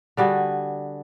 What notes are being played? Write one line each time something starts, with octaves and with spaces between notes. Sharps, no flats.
D3 G3 F#4 G#4